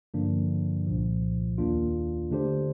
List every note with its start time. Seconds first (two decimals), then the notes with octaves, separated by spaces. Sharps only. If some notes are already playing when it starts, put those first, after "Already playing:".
0.14 G2 D3 F3 A#3 D4
0.86 C2 A#2 F3
1.58 D#2 D#3 A#3 D4 F4
2.31 D3 A3 D4 G4 C5